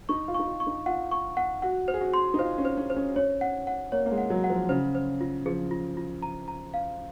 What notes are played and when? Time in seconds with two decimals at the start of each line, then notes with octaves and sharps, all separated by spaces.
0.09 D#4 C#6
0.28 F4
0.34 C#6
0.40 D#4
0.47 F4
0.60 C#6
0.67 D#4
0.86 F4 F#5
1.11 C#6
1.37 F#5
1.62 F#4 F#5
1.88 C5
1.94 G#4
2.01 F#4
2.14 C6
2.34 D#4
2.39 F4 C5
2.58 C#4
2.65 C5
2.77 C#4
2.90 C5
2.96 C#4
3.16 C#4 C#5
3.41 F#5
3.67 F#5
3.92 A#3 C#5
4.06 A#3
4.11 G#3
4.18 F#5
4.30 F#3
4.44 F#5
4.50 F3
4.69 C#3 C5
4.95 C5
5.21 F4
5.46 F3 G#4
5.71 F4
5.97 F4
6.22 A#5
6.48 A#5
6.74 F5